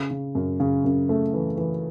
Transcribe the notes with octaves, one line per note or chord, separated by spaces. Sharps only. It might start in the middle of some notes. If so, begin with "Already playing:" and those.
Already playing: C#3
C#3
F#2
C#3
F#2
A3
E3
E3